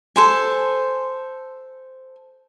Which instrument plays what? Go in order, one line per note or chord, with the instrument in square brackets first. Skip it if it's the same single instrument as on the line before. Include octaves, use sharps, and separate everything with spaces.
[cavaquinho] A4 C5 G#5